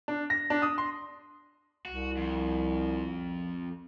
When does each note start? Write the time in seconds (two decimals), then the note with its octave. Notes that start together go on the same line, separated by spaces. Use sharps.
0.08 D4
0.30 A#6
0.50 D4
0.62 D#6
0.78 C6
1.85 C2 F#4
2.17 F2